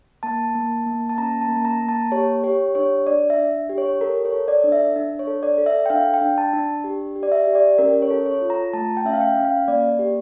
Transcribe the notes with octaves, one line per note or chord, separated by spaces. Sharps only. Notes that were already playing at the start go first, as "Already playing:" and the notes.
A#3 A5
A#3
A#3
A5
C#4 A#5
A5
A#3
A#5
A#3
A5
G4 C#5
G4 C#5
D4 C#5
D4 D5
E5
D4
G4
C#5
A4 A#4
C#5
A4
D5
D4
E5
D4
C#5
A4
D5
A4
E5
G5
D4 F5
G5
D4
A5
D4
G4
G4
D5
E5
G4
D5
C#4 A#4
C#5
A4
C#5
F4
A#5
A3 A5
G5
C#4 E5
F5
G5
C#4
F5
A#3 D5
G4